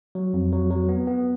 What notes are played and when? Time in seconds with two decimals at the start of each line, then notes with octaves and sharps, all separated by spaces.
0.15 F#3
0.34 F2
0.52 F#3
0.71 F#3
0.89 B3
1.07 B3